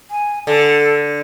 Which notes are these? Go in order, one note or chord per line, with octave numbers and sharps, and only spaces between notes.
G#5
D3 A4